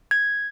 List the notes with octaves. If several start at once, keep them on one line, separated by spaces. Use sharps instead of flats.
G#6